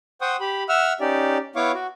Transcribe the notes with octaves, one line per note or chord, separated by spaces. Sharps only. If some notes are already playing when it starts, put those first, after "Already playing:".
C5 F#5 G5 C#6 D#6
G4 B5
E5 F#5 E6 F6
C#4 D#4 G4 D5
B3 E4 C#5 F5 C#6 D6
F#4